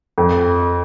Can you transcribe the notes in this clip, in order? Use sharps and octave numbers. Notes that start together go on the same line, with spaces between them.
F2